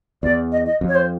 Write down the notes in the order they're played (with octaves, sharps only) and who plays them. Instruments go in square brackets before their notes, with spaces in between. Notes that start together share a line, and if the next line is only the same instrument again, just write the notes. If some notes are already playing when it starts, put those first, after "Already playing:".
[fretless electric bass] E2 [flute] D5
[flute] D#5
D#5
[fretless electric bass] F2
[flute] C#5
C5